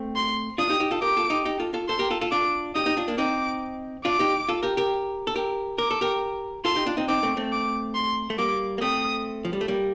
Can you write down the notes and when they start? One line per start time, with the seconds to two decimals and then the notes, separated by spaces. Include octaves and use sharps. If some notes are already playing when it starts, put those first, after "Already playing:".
Already playing: A3 C4
0.16 C6
0.58 D4 F4 D#6
0.69 D#4 G4
0.80 D#4 G4
0.91 F4 A4
1.02 G4 A#4 D6
1.17 F4 A4
1.30 D#4 G4
1.45 D#4 G4
1.60 F4 A4
1.74 F4 A4
1.88 A4 C5 C6
1.99 G4 A#4
2.10 F4 A4
2.21 F4 A4
2.32 D4 F4 D6
2.75 D#4 G4 D#6
2.86 D#4 G4
2.97 D4 F4
3.08 A#3 D4
3.18 C4 D#4 D6
4.05 D4 F4 D6
4.19 D#4 G4
4.49 F4 A4
4.63 G4 A#4
4.77 G4 A#4
5.27 A4
5.36 G4 A#4
5.78 A#4 D6
5.91 A4
6.01 G4 A#4
6.65 F4 A4 C6
6.76 D#4 G4
6.87 D4 F4
6.97 C4 D#4
7.08 C4 D#4 D6
7.23 A3 C4
7.37 A3 C4
7.52 D6
7.95 C6
8.30 A3
8.38 G3 A#3 D6
8.78 A#3
8.81 A3 C4 D#6
9.45 F3
9.53 G3
9.61 A3
9.68 G3 A#3